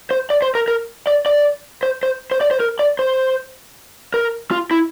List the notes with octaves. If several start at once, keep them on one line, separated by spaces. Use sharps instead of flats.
C5
D5
C5
A#4
A#4
D5
D5
C5
C5
C5
D5
C5
A#4
D5
C5
A#4
F4
E4